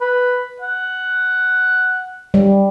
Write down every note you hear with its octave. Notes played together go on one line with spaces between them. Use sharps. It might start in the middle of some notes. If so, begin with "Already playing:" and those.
B4
F#5
G3